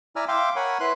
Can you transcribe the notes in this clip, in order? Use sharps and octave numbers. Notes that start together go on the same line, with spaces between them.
E4 D5 G#5 A#5 E6 F6
E5 F5 G5 C6 D6
A#4 C#5 F#5 G#5 B5
E4 B4 C6 F#6